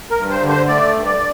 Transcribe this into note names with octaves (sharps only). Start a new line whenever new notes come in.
A#4
G2
C5
D3
C5
A3 D5
G2
D5